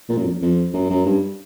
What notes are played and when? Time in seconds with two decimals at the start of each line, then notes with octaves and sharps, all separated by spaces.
0.09 A#2
0.18 F#2
0.25 F2
0.42 F2
0.74 F#2
0.90 F#2
1.06 G2